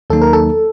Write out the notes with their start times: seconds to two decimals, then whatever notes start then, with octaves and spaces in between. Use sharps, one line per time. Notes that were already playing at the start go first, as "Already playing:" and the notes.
0.10 D#2 D#3 F#3 A#3 D#4 A4
0.22 A#4
0.33 A4